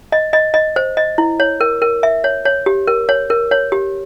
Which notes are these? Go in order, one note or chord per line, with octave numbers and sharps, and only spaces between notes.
D#5
D#5
D#5
C5
D#5
E4
C#5
A#4
A#4
E5
C#5
C#5
G4
A#4
C#5
A#4
C#5
G4